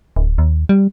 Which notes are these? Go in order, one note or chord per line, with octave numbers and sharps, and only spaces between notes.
D1
D#2
G3